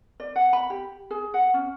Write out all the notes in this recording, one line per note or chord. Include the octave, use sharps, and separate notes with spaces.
D5
F#5
B5
G4
G#4
F#5
C#4